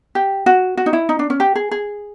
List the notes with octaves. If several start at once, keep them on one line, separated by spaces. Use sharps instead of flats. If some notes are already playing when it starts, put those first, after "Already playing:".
G4
F#4
F#4
D#4
E4
D#4
D4
C#4
G4
G#4
G#4